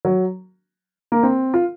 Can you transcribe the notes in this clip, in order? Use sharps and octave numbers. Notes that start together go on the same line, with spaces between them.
F#3
A#3
C4
F4